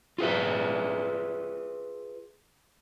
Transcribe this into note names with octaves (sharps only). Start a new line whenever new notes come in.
F4 G#4 B4 E5